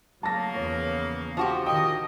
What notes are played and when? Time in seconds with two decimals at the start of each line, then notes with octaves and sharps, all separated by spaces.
0.23 C#3 F#3 A3 A#3 A5 A#6
0.55 E2 F3 B3 C#5
1.37 F3 F#4 G4
1.66 D3 D#3 D#5 G5